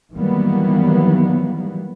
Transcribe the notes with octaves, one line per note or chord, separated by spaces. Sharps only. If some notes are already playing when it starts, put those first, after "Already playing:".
D#3 E3 F#3 G3 A#3 B3